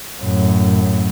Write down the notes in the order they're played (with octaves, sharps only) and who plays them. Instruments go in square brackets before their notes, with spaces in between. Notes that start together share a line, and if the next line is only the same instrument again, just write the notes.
[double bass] F#2 A2